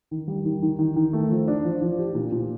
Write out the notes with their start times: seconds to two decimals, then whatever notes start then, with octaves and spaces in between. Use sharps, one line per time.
0.11 D#3
0.28 G3
0.45 D#3
0.62 D#3
0.79 D#3
0.96 D#3
1.13 A3
1.31 F3
1.48 D4
1.65 F3
1.82 F3
1.99 G4
2.15 A#2
2.32 A#2